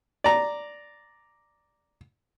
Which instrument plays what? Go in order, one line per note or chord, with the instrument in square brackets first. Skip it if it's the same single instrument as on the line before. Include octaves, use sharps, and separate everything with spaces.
[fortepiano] D5 A#5